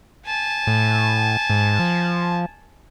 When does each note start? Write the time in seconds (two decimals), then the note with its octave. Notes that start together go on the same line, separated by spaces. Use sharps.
0.26 G#5 A5
0.67 A2
1.50 G#2
1.79 F3